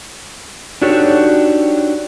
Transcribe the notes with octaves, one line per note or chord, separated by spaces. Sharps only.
D4 D#4 F#4 G4 A4 C#5